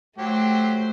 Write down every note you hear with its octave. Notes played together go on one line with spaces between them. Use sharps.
F#3 A3 G4 C5